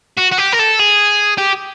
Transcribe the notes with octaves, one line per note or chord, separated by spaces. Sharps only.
F#4
F#4
G4
A#4
A4
G#4
G4